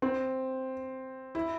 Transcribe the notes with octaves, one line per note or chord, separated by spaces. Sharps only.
C4
E4